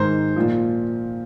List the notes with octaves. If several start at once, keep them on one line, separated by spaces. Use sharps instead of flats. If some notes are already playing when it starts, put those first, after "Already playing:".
Already playing: G#2 D#3 C5
A#2 F3